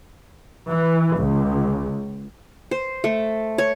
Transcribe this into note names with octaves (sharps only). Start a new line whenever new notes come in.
E3
C#2
C5
A3
C#5